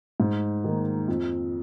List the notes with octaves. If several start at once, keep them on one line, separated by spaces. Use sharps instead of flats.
G#2
D#3 A#3
F2